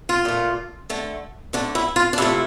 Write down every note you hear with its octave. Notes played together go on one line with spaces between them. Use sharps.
F4
A#2 A3
D3 A3
D3 A3 D4
E4
F4
D4
C3 F3 A3 E4